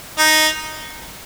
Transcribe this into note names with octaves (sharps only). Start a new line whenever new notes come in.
D#4